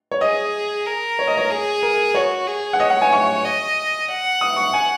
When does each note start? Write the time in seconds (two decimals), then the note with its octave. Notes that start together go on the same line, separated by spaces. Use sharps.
0.12 C#5
0.21 G#4 D#5
0.86 A#4
1.19 C#5
1.27 D#5
1.37 C#5
1.51 G#4
1.83 A#4
2.15 F#4 C#5
2.47 G#4
2.73 F#5
2.80 C#5 D#5
2.90 F#5
3.02 G#5
3.12 C#6
3.44 D#5
4.08 F#5
4.41 D#6
4.56 C#6
4.74 G#5